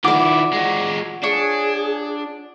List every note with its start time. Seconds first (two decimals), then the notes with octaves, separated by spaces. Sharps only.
0.04 D#3 E4 F4 D5 F5 F#5 D6
0.53 G#3 F#4
1.23 D4 G#4 C#5